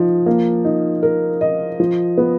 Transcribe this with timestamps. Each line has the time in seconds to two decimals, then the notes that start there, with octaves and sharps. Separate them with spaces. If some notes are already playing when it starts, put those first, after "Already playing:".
Already playing: F3 D#4
0.26 A#3
0.65 D#4
1.03 A#4
1.41 D#5
1.80 F3
2.18 B3